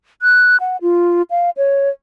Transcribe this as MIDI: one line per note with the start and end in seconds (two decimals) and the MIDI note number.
0.22 0.57 90
0.60 0.77 78
0.82 1.22 65
1.30 1.50 77
1.57 1.89 73